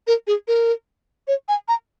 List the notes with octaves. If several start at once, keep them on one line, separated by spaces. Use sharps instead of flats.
A#4
G#4
A#4
C#5
G#5
A#5